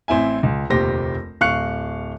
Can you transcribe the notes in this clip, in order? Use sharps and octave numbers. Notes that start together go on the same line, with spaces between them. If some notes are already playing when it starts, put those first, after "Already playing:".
A1 C4 E4 E5 G#5
C#2
F1 A#1 D#2 G4 C5 A#6
D1 F5 C#6 F#6 C#7